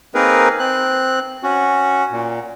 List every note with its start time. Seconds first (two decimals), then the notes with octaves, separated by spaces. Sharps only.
0.15 A#3 C4 D#4 G#4 A#4 B4
0.59 C4 F#6
1.43 C#4 F#4
2.11 A#2